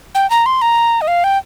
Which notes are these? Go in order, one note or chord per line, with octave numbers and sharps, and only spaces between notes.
G5
A#5
C6
A#5
D#5
F5
G5